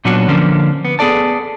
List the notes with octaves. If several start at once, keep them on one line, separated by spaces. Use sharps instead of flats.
A#2 F#3 B3 C#4 D4 F#4
D3 F3 A#3 C#4 D4
B3
B3 G#4 A4 D5 A5